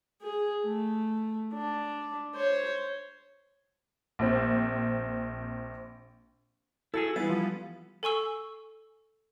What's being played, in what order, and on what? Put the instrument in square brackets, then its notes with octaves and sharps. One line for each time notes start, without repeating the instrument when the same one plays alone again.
[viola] G#4
A3
D4
C5 C#5
[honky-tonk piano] A#1 C4
[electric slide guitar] E4 F#4 G#4 [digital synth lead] A4 [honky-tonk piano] E6
[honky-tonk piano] E3 B3 [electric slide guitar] G3 [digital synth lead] A6
[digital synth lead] F3
[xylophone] A4 G#5 C#6 E6